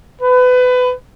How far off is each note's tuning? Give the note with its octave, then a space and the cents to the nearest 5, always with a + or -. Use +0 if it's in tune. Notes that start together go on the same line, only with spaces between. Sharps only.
B4 +25